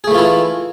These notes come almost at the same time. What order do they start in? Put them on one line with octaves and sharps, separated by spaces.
G#4 A3 E3 F4 E4